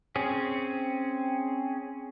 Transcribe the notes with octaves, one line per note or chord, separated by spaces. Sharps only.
C4 C#4 G#4